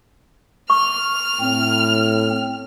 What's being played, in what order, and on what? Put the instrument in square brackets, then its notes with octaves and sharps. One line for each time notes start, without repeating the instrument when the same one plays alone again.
[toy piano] C#6 [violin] F6
[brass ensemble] A2 [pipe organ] C4